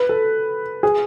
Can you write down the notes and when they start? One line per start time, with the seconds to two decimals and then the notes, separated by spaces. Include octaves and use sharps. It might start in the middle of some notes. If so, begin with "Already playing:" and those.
Already playing: B4
0.09 A4
0.83 G#4